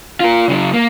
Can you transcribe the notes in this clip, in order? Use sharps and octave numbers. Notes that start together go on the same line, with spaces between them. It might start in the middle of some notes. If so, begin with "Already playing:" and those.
F4 A#4
C#3 F#3
A#3